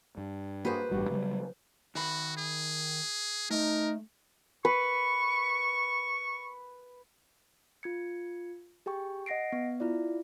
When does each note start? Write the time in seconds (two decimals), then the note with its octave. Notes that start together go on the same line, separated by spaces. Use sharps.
0.17 G2
0.65 A#3 F#4 G#4 B4 C5
0.91 A1 G2 G3 F#4 G4
1.10 C#3 F#3 G3
1.95 D#3 F#4 B5
2.37 G#4
3.51 A3 D#4 A#4
4.65 B4 C#6
7.83 F4 G#6 C#7
8.86 G4 G#4 G5 C#6
9.26 D#5 F#5 A#6 C7 D7
9.52 B3
9.80 E4 F4 D5